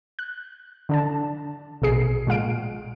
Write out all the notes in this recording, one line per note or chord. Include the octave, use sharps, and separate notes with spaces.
F#6
D3 D4 A5
A#1 B2 G#4 C7
A#2 G#3 F5 D7